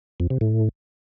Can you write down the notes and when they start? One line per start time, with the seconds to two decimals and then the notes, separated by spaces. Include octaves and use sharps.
0.20 F2
0.30 C3
0.41 A2